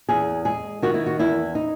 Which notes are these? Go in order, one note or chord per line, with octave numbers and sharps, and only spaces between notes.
E2 G#4
G#3 G#4
D#3 F#4
E4
F#4
E2 E4
D#4